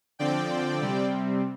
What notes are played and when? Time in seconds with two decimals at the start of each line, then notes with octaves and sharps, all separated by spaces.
0.19 D3 F3 C4 D5 G5
0.81 C3 G3 C4